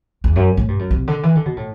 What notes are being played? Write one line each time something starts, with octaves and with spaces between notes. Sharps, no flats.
E2
F#2
A2
G2
F#2
C3
D3
E3
D3
B2
A2